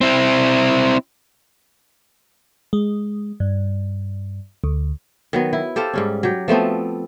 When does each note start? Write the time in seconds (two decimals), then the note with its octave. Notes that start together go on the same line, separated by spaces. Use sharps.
0.01 C4 E4
2.73 G#3
3.40 G2
4.64 D2
5.33 D#3 F#3 B3
5.53 E4
5.76 G4 A4 C5 F5
5.93 G#2 G3 C#4
6.23 F#3 G4
6.48 F3 A3 B3 C4